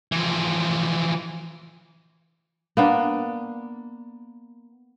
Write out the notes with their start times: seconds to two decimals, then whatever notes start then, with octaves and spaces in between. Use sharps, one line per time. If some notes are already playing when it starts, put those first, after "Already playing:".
0.12 E3 F3
2.77 A#3 B3 D4